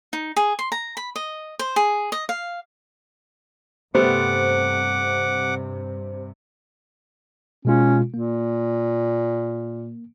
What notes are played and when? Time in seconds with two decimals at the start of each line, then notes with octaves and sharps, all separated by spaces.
0.13 D#4
0.36 G#4
0.59 C6
0.72 A#5
0.97 B5
1.16 D#5
1.59 C5
1.76 G#4
2.12 D#5
2.29 F5
3.95 G2 C3 G3 A3 B3 C5 F#5 D6
7.65 B2 G#3 C#4 F4
8.14 A#2 A#3